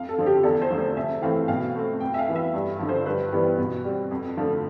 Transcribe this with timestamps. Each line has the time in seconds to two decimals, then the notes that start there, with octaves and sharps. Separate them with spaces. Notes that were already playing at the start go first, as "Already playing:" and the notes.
Already playing: F2 F5
0.09 A4
0.18 D3 F3 C4
0.26 G4
0.43 E2 A4
0.62 C5
0.70 D3 F3 A3 C4
0.79 C5
0.96 C3 E5
1.22 E3 A3 C4 F5
1.48 B2 F5
1.74 A3 C4
2.00 F2 G5
2.14 E5
2.19 F5
2.28 E3 B3
2.36 E5
2.54 G2
2.79 D3 F3
2.89 C5
3.06 G2 B4
3.33 E3 G3 B3
3.58 B2
3.84 G3 C4
4.11 F2
4.37 D3 F3 A3